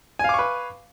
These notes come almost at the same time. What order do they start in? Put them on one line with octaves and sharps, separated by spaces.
G#5 F5 D6 C#6 B4